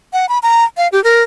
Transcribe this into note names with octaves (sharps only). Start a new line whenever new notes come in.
F#5
B5
A#5
F5
G4
A#4